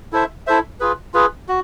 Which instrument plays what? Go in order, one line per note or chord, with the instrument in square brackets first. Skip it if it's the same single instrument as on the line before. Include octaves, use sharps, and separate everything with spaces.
[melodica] E4 A4 C5 E5
E4 A4 C5 E5
F4 G#4 B4
F4 G#4 B4
F#4